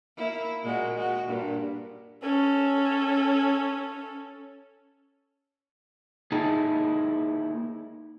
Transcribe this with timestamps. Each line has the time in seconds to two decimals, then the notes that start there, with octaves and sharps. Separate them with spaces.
0.17 A#3 E4
0.63 A#2 G#3 F#4
0.94 G#3 F#4
1.26 G2 A#2
2.22 C#4 A4
6.32 A#3 D#4 E4 G#4 A5